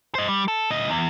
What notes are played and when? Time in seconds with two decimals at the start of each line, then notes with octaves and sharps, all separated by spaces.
0.15 C5 D#5
0.28 G3
0.48 A4
0.71 D2 D#5
0.90 E2